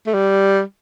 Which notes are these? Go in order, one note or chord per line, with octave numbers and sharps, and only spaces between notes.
A3
G3